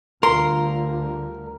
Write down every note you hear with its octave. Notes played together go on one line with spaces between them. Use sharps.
D2 D3 G3 F4 A#4 C6